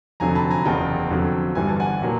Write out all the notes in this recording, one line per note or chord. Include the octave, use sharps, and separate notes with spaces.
F1 F2 D3 F#3 G#5 A#5
A5 B5
G#5 A#5
F#1 E2 C#3 G5 A5
F2 D3 F#3
G1 G2 E3 G3 G#5
A5
F#5 G#5
A#2 F#3 A#3